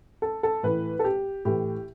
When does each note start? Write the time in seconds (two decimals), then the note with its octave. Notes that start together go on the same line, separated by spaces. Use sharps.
0.22 A4
0.43 A4
0.63 A2 E3 B4
0.99 A4
1.04 G4
1.45 A2 E3 G4